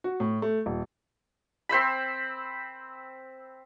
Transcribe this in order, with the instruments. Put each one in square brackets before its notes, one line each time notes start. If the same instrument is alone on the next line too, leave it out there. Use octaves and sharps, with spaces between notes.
[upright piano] F#4
A2
A3
D#1
[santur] C4 C5 E5 B5